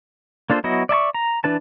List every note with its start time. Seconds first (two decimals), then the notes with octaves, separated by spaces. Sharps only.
0.50 A#3 D4 F4 A4 C5
0.64 F#3 B3 E4 F#4 D#5
0.89 D5 E5 A5 C#6
1.14 A#5
1.44 E3 D4 B4 A5